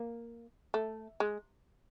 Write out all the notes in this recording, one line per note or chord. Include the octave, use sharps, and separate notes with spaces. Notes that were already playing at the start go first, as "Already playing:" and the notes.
Already playing: A#3
A3
G#3